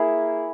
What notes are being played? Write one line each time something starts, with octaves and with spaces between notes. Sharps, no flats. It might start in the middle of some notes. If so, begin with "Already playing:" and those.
Already playing: A#3 E4 G#4